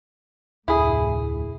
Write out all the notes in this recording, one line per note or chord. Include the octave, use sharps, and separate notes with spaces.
F1 D2 A2 E4 G#4